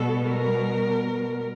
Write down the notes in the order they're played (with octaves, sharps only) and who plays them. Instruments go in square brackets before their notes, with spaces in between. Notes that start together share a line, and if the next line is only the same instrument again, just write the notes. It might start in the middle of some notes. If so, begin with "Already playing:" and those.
Already playing: [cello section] B2 G3 B3 A4
A#4